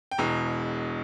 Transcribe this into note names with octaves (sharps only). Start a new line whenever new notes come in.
G5
E1 E2 B2 A#5